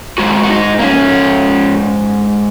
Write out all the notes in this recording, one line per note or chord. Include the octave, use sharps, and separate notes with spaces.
G#2 G#3 F#4
F#4
D#4
A#3
C#4